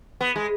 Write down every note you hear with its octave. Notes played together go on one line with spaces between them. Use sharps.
B3
G#3